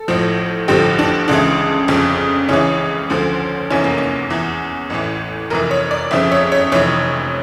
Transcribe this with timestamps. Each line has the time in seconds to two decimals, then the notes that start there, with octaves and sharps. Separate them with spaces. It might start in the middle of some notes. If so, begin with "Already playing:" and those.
Already playing: A4
0.08 A1 A2 F3
0.68 A1 G2 D3 F3 G4
0.99 D4
1.28 C#2 C#3 E3 D4
1.88 G1 F2 C#3
2.49 C#2 C#3 E3 C#4
3.10 D2 D3 F3
3.70 F1 E2 E3 C#4
3.84 A#3
3.98 C#4
4.30 E2 E3
4.90 A1 A2 E3
5.50 F1 F2 E3 A#4
5.71 C#5
5.91 D5
6.11 G1 F2 C#3 F3 E5
6.32 C#5
6.52 C#5
6.72 F1 F2 E3 C#5